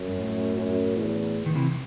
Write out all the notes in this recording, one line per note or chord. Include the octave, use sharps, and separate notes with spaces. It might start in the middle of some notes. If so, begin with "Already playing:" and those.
Already playing: F#2
G2
A2
F#2
E2
D#3
C3 E3